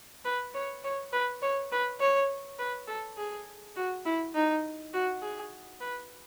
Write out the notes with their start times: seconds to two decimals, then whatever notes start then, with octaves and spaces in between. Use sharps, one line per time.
0.25 B4
0.54 C#5
0.84 C#5
1.13 B4
1.42 C#5
1.72 B4
2.00 C#5
2.59 B4
2.88 A4
3.18 G#4
3.76 F#4
4.05 E4
4.35 D#4
4.94 F#4
5.22 G#4
5.81 B4